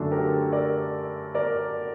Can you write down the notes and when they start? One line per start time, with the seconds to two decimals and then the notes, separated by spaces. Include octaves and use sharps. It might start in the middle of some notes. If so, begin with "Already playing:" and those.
Already playing: F#2 D3 A3 D4 F#4 A4
0.11 G4 A#4
0.52 A#4 D5
1.35 A#4 D5